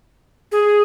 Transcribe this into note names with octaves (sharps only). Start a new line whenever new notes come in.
G#4